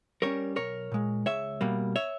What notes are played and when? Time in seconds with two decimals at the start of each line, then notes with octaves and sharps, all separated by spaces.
0.22 G3 C#4 A#4 C#5
0.56 B1 A#4 C#5
0.92 A#2 G#3
1.26 C#2 C#5 E5
1.61 B2 G3 A#3
1.96 C#5 E5